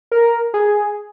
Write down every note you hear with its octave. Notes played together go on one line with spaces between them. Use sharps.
A#4
G#4